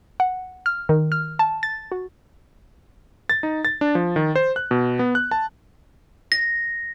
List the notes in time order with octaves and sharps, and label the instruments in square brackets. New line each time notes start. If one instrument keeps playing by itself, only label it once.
[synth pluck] F#5
F6
D#3
F6
A5
A6
F#4
[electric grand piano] A6
D#4
A6
D4
F3
D#3
C5
F#6
B2
B3
F#6
A5
[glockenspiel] A#6